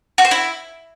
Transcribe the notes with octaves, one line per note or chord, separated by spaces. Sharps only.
F#4
C5
E4